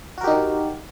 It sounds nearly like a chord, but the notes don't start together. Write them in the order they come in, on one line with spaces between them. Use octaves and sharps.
F#4 A#4 G4 D#4